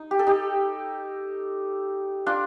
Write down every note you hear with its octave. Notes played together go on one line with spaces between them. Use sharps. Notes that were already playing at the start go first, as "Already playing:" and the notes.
Already playing: D#4
G4
A4
D#4 G4
D4 F4